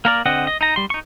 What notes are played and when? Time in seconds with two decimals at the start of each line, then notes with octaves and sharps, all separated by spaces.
0.05 A#3 A#4 D5
0.26 D3 C4 D#5 F#5
0.47 D#5
0.61 D#4 A#5
0.76 G3 C6
0.90 D#4 C#6